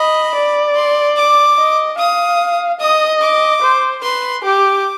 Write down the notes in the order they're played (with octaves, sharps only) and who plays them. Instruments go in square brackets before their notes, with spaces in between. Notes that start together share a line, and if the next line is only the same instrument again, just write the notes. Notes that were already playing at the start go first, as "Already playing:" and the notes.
Already playing: [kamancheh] D#5 [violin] B5
[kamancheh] D5
[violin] C6
D6
[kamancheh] D#5
[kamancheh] F5 [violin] D#6
[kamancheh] D#5 [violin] D#6
[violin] D6
[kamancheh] C5
[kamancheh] B4 [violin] C6
[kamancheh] G4 [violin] D6